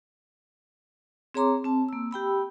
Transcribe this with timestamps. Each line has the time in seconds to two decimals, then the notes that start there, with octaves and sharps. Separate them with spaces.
1.34 C4 G#4 C#5 A#5 C6 D6
1.64 C4 A5
1.89 A#3 E6
2.11 G4 G5 B5 E6